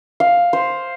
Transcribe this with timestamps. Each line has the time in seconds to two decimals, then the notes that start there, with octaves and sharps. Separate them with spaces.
0.20 F5
0.53 C5